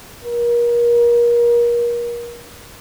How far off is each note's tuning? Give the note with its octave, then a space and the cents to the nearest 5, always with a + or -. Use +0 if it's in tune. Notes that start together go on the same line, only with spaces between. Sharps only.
A#4 +30